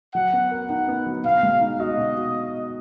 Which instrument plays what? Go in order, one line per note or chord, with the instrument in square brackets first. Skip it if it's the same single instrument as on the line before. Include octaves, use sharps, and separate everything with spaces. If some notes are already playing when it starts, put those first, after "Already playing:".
[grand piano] F#3 [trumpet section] F#5
[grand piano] B3
A#4
[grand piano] D#4 [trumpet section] F#5
[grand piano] B3
F#3
[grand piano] B2 [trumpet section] F5
[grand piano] G#3
D#4
[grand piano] F#4 [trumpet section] D#5
[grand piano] B2
F#4